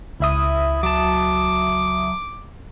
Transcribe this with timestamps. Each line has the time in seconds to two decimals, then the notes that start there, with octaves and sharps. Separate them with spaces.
0.20 C#2 E4 E5 D#6
0.83 F#3 A5 D6